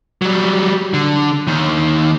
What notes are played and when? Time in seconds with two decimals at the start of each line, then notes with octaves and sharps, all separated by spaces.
0.22 F#3 G3
0.94 D3
1.47 D#2 D#3